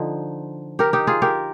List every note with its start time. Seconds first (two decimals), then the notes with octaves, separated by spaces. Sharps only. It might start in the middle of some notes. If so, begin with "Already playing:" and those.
Already playing: D3 F3 D#4
0.79 G4 A#4
0.93 D#4 G4
1.07 F4 G#4
1.22 G4 A#4